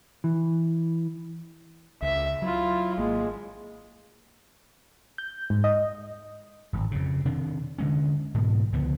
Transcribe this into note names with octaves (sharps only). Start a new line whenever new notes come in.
E3
C#2 E5
F#3 E4 F4
G#1 G#3 A#3
G6
G#2
D#5
D1 G#1
F2 C#3
C3 D#3 D4
D3 G#3 C#4
G#2 B2 E3 G#3
C#2 D3 F3 B3